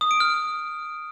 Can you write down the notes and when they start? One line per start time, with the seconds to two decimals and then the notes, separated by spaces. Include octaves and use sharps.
0.01 D#6
0.11 D7
0.20 F6